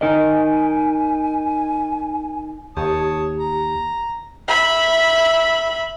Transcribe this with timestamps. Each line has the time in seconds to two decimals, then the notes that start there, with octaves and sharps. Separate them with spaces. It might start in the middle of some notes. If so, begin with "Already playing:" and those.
0.01 D#4 A#4 D#5 G#5
2.77 D#2 G4 C#5 A5 D#6
3.40 A#5
4.48 E5 B5